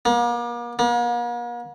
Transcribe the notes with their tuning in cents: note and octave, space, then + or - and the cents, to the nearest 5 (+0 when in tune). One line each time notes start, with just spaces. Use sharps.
A#3 +40
A#3 +45